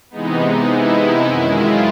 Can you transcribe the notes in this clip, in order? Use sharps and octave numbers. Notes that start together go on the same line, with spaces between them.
C3 E3 G#3 B3 D#4
E4
E4
F#2 D#3 G#3
F4